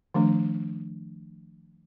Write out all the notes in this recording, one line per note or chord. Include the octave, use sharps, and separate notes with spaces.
D#3 F3 A3 D4